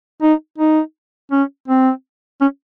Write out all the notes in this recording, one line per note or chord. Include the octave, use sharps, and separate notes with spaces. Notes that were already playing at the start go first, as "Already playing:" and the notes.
D#4
D#4
C#4
C4
C#4